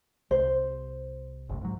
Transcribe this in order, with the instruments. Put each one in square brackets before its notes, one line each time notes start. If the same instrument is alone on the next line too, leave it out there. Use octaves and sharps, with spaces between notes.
[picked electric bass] C2 [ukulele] C5
[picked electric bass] F#1 C2 A2
G#2 F#3